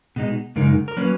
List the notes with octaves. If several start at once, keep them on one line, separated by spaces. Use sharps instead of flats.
B2 G#3 D#4
F#2 C#3 G#3 D#4 A#4
A#4
F#3 A#3 C#4 B4